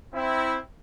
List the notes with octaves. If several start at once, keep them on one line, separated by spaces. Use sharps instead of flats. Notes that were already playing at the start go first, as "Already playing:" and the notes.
C4 E4